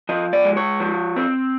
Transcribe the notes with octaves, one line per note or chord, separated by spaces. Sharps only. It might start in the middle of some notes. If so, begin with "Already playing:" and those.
F3 D#5
D5
G#3
C#5
F3
C4